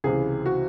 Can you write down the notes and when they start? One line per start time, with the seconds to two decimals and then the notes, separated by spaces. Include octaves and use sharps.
0.04 C#2 C3 E3 G#4
0.46 F#4